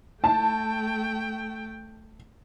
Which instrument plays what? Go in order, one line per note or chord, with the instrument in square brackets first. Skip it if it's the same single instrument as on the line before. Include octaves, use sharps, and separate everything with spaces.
[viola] A3 G5 [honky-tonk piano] A5